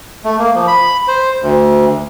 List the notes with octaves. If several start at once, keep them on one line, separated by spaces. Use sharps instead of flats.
A3
A#3
F3
B5
C5
D2